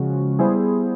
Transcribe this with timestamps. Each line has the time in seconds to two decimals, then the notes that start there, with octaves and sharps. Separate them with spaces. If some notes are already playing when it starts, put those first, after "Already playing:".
Already playing: C#3 F3 G#3 C#4 F#4
0.39 G3 B3 E4 G#4 C5